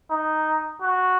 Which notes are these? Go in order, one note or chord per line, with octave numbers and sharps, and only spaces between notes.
D#4
F#4